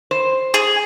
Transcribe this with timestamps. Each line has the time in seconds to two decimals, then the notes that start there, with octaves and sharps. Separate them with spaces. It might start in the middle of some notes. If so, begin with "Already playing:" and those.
0.11 C5
0.54 G#4